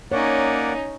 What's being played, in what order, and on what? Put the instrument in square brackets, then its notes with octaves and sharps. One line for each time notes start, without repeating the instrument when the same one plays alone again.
[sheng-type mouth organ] A#3 D5 F#5 [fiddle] C#4 D#4 [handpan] C#5